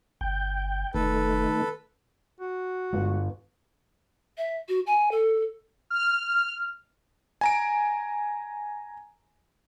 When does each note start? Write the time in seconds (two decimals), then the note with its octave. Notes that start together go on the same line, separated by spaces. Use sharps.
0.21 G1 G5
0.94 F1 D#3 A3 A4 B4
2.41 F#4
2.93 G1 G#3
4.38 E5
4.69 F#4
4.87 G#5
5.11 A4
5.90 F6
7.41 G#5 A#5 D7